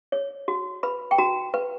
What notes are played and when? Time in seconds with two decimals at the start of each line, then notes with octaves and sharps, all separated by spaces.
0.12 C#5
0.48 F#4
0.83 B4 B5
1.11 G5
1.18 F#4 A#5
1.54 B4